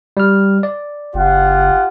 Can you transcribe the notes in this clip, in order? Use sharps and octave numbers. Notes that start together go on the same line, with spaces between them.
G3 F6
D5
F#1 F4 G4 F#5